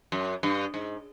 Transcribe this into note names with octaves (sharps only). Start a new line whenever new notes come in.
F#2
G2
G#2